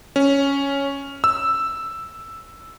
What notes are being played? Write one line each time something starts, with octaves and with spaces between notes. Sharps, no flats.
C#4
E6